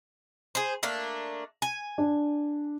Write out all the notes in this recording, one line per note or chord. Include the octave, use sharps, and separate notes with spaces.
G#4 C5
A3 A#3 D4
G#5
D4